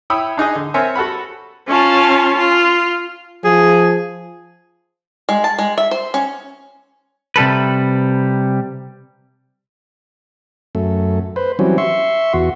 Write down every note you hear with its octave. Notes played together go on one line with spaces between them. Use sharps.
E4 C#5 G5 B5 D#6 E6
D4 D#4 G#4 D#5
D3
C4 A#4 C#5 E5 G#5
F#4 A4 F#5 B5
C#4 F4 A5
F4
F3 G#4
G#3
A5
G#3
E5
C5
C#4
C3 G3 A4 B4
F#2 A3
B4 C5
E3 F#3 G3 C4 C#4
E5 C6 C#6
E2 F#4